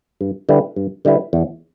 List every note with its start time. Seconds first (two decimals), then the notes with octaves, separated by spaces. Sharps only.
0.21 G2
0.49 D3 G3 E4 B4
0.76 G2
1.05 D3 G3 E4 B4
1.33 E2